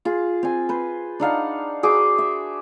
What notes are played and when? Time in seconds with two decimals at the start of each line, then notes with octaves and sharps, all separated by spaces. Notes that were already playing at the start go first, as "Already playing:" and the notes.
0.05 F4 G#4
0.43 C4 G#5
0.69 B4 C5
1.20 D4 D#4 F5 F#5
1.83 F#4 G#4 C5 D6
2.18 E5